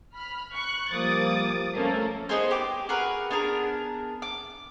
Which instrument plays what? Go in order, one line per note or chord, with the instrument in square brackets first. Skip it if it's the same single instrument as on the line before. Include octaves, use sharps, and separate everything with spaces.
[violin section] B5 F6
C#6 F#6
[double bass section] F3 G3 A#3 [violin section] D6 D#6 A6
[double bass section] F3 A3 C#4 [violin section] A#3 A4
[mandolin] B3 D#4 G#4 C5
G4 D6
F#4 G#4 A#4 B4
B3 D4 G#4 A#4
D6